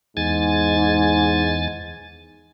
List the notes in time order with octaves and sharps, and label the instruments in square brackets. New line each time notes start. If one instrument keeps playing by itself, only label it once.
[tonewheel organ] E2 G#5 A6 [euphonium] G#2